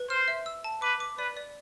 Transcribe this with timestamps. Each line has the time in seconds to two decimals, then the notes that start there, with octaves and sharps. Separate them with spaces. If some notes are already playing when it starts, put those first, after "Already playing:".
Already playing: B4
0.10 C5 F6
0.28 E5
0.46 E6
0.64 A5
0.82 B4 D6
1.00 D6
1.18 B4 D5
1.37 D5